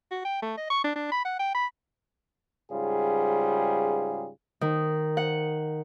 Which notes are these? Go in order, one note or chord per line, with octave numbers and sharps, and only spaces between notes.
F#4
G5
A3
D#5
C#6
D4
D4
B5
F#5
G5
B5
G#2 C#3 G3 F4 G#4
D#3
F#5